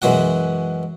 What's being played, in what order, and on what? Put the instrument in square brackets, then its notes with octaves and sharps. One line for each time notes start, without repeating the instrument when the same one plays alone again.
[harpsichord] F#2 E3 G#3 F#4 F#5